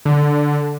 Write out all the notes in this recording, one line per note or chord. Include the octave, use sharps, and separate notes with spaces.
D3